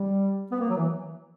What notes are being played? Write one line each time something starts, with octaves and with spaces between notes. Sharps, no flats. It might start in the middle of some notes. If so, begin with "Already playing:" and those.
Already playing: G3
B3
A#3
F#3
E3